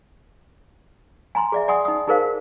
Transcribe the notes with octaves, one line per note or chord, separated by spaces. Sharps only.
G#5 A#5 C6
G#4 D5 E5
D5 F#5 G#5 C6 D#6
D#4 D#6
D#4 G#4 A#4 C5 F5